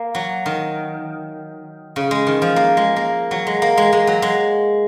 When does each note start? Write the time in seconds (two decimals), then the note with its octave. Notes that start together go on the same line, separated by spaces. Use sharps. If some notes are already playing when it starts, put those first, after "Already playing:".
Already playing: A#3
0.15 F#3
0.46 D#3
1.96 C#3
2.11 G#3
2.27 D#3
2.42 F3
2.56 A#3
2.77 G#3
2.96 A#3
3.31 F#3
3.47 G#3
3.62 A#3
3.77 G#3
3.93 G#3
4.07 F#3
4.22 G#3